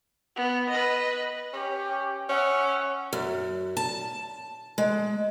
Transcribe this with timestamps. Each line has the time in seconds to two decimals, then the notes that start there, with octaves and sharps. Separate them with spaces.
0.36 B3
0.70 B4 D#5
1.53 C#4 G4
2.29 C#4 E5 F#5
3.13 F#2
3.77 A5
4.78 G#3